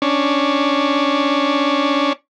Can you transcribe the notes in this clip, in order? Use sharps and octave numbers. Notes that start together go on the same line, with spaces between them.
C#4 D4